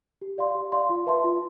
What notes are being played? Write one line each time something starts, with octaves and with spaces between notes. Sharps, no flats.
G4
D5 F5 C6
G4
D5 F5 C6
F4
B4 E5 A5 C6
F4